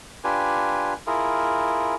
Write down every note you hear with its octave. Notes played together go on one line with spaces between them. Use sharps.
D4 F4 G4 B4 G#5
E4 F4 G#4 A#4